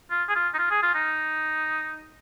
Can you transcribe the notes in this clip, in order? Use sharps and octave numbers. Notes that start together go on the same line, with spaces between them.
F4
G#4
F4
D#4
F4
G#4
F4
D#4